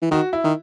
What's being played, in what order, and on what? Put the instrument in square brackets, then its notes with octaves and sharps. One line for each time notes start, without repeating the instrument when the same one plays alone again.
[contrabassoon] E3
[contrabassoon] D#3 [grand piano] F#4
[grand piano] E4
[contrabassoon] D#3